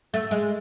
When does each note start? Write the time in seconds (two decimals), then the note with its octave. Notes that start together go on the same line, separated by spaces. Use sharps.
0.14 A3
0.31 G#3